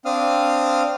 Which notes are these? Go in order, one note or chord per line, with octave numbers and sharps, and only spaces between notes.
C4 D4 F5 D#6 F6